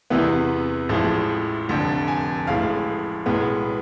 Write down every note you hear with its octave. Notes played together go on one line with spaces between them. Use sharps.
E2 C3 E3 B3
A1 A2 F3 G#3
F1 F2 D3
G#5
A1 A2 G#3 F5
B1 A2 G#3 B3